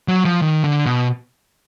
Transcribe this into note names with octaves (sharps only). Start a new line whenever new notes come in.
F#3
F3
D#3
D3
B2